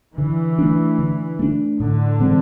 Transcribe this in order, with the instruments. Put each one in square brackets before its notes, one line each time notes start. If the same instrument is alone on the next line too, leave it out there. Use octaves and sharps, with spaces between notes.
[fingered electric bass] D3 [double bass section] E3
[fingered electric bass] A3 D4
D3
A3 D4
[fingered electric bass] A2 [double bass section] D3
[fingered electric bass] E3 G#3 C4